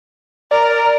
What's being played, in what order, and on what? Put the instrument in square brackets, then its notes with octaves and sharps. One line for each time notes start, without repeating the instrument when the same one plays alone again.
[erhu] A#4 [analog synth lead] D5